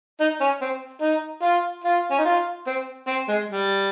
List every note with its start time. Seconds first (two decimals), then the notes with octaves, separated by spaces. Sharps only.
0.20 D#4
0.41 C#4
0.61 C4
1.02 D#4
1.43 F4
1.84 F4
2.11 C#4
2.18 D#4
2.25 F4
2.67 C4
3.07 C4
3.28 G#3
3.49 G3